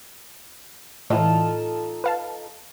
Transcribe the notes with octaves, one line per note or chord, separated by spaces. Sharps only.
A2 E3 D#4 F4 A4
B4 F5 A5